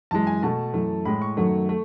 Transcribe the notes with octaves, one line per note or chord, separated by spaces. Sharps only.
F#2 E3 G#3 A5
G#5
B2 A3 A5
F#2 E3 A3
A2 G#3 B5
C#6
F#2 D#3 F#3 A3
A3